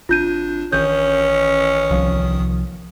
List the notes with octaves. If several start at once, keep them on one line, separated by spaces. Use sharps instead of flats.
G#1 D4 F4 G6 D#7
A1 D#3 C#4 D#6 G6
C2 F3